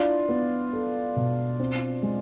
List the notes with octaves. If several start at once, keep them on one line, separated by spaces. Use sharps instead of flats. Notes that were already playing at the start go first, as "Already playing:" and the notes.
Already playing: D4 E4 F4
B3
A4
B2
C4
G#3